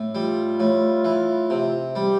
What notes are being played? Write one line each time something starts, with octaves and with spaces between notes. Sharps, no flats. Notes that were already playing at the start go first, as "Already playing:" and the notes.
Already playing: A2
G3 F4
A2
E3
C3
G3 G4